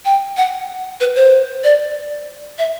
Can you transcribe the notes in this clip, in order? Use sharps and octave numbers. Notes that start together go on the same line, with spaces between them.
G5
F#5
B4
C5
D5
E5